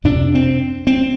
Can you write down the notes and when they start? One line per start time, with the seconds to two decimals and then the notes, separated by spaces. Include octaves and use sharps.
0.04 F2 C3 D4
0.35 C4
0.87 C4